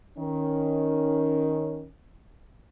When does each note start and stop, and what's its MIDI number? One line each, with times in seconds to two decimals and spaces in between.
0.18 1.87 51
0.18 1.87 61